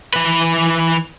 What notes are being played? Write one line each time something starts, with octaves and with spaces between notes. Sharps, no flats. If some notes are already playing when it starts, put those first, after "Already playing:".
E3 B4